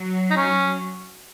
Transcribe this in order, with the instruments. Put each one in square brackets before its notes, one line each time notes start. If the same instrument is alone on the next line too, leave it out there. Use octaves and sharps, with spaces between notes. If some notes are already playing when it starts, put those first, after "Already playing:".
Already playing: [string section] F#3
[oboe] D#4
C#4